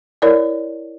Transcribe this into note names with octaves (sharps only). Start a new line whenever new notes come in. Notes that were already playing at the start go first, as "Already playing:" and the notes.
E4 A#4 C#5 D5